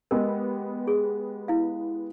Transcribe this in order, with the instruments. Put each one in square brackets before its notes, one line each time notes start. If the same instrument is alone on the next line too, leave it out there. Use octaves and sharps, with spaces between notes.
[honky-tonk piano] G#3 B3 G4 [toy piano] A#4
[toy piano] G#4
E4 F5